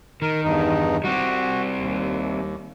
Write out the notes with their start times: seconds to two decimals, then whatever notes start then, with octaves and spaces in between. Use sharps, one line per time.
0.22 D#3 A#4
0.44 E2 G2 D#4
1.04 G3 C4 F#4
1.79 D#2